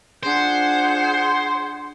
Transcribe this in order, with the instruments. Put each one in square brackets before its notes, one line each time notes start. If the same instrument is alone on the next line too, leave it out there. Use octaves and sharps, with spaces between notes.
[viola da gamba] D4 F4 [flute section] G#4 F#5 G6 [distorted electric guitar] C5